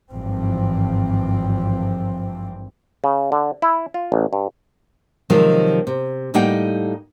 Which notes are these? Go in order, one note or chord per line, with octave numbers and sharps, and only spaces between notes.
G#1 G2 E3 F3 C4
C#3
D3
E4
F4
A1
G2
C3 D#3 F3 F#3 G#3
C3
A2 G3 A#3 D#4 F#5 G5